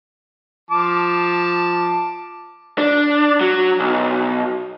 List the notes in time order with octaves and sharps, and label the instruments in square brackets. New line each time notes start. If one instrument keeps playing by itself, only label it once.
[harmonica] F3 A5 D6
[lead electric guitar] D4
F#3
B1